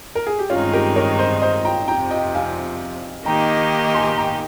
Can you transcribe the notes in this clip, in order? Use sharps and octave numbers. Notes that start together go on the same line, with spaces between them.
A#4
G#4
G4
G2 D#3 G#3 C4 C#4 D#4 F4
G4 A#4
A#4 C#5
C5 D#5
C5 D#5
G5 A#5
F2 C3 F3 G5 A#5
D#5 G5
F5 G#5
D#3 A#3 D#4 G4 G5 A#5
G#5 C6
G5 A#5